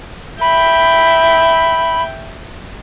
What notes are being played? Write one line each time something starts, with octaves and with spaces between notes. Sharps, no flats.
E5 G5 B5